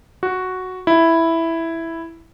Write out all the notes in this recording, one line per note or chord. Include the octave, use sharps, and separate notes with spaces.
F#4
E4